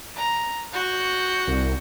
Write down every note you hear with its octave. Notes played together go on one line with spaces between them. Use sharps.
A#5
F#4 G6
C2